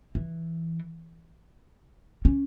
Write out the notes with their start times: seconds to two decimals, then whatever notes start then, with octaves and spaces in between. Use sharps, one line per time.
0.15 E3
2.25 C#4